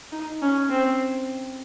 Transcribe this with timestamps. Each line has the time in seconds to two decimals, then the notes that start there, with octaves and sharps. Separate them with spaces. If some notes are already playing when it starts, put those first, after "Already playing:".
0.12 D#4
0.41 C#4
0.70 C4